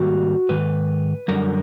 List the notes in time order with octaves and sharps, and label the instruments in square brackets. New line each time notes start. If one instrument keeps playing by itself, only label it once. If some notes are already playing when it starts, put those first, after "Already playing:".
Already playing: [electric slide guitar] G#2 D#3 G3 A#3 F#4
G#2 D#3 B4
F#2 D3 G3 A#4